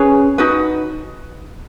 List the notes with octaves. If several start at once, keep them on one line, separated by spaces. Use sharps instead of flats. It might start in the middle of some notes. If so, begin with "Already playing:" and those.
Already playing: C#4 G#4 B4 C#5
D#4 F#4 B4